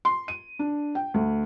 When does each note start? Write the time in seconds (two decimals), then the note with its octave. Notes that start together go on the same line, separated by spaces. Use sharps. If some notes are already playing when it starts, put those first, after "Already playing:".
0.05 C6
0.28 D#7
0.59 D4
0.95 G5
1.14 D2